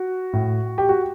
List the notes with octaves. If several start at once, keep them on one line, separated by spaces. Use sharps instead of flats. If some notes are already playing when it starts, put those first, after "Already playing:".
Already playing: F#4
A2
G4
F#4